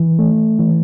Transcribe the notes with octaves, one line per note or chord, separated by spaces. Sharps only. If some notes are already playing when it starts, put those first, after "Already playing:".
Already playing: E3
A3
E3